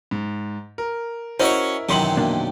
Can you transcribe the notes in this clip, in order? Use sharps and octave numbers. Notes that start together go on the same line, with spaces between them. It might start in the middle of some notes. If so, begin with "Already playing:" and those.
G#2
A#4
C#4 E4 F#4 A#4 C5 C#5 D#5 E5
F#2 C3 D#3 E3 C6 F#7
B2 A#3 D4